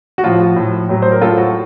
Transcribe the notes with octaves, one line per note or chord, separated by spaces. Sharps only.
F#4
A2 F3 F4
F#4
A2 F3
A2 F#3
C5
A#4
A2 F#3 F4 A4
F#4